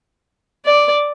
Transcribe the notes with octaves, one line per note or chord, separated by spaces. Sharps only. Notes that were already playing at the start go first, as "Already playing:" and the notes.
D5